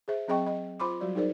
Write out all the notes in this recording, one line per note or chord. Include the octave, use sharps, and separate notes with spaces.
G#4 C5 E5
F#3 C4 G#4 D#5 G5 C#6
D#5
F4 C5 B5 C6 D6
F#3 G3 F#4 D5
D#4 G#4 A#4 C5 D5